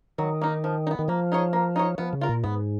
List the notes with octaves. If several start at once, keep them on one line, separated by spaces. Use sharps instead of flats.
D#3 F#3
A#3 D#4
F3
D#4
B3
D#3
F3 A#3
D#4 G#4 C#5
A#3
D#4 G#4 C#5
F3 B3
C#3
F4 A#4
A#2
G#2 B3